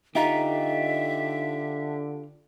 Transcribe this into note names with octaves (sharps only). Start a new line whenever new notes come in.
D3 D#4 F4 G4 E5